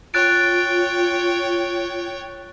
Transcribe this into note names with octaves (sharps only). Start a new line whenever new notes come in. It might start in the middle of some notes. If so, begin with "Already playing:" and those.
F4 C#5 G5 F#6 A6 D7